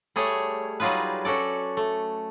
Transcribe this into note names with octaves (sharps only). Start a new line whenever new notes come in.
G3 A3 G#4 C#5
F#3 G3 D#4 F4 G#4 B4
C#4 F#4 A4 D5
A3